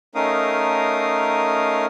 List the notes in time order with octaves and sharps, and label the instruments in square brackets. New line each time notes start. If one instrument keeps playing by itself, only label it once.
[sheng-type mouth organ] A3 C#4 D#4 A#4 F5 D#6